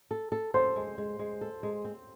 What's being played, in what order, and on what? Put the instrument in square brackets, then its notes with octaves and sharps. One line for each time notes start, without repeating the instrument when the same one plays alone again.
[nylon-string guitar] A4
A4
[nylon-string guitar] A4 [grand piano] C5
[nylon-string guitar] G#3
G#3
G#3
A4
G#3
C4